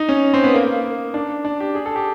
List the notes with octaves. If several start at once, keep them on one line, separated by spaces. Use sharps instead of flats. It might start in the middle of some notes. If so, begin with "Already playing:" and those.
Already playing: D#4
C#4
C4
B3
A#3
A#3
D4
D4
G4
G#4
A4
G4